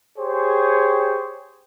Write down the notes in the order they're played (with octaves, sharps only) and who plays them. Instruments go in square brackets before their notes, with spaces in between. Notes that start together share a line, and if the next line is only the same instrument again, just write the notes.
[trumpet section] G4 G#4 C5 C#5